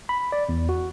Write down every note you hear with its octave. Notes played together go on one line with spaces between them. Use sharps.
B5
D5
E2
F#4